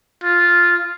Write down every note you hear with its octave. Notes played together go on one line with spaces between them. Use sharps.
F4